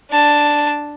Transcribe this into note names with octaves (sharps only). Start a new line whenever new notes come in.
D4 A5